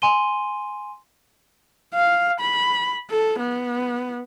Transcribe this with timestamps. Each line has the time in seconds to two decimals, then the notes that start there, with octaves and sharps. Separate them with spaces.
0.02 G#5 C6 D#7 G7
1.94 F5
2.40 B5
3.10 A4
3.39 B3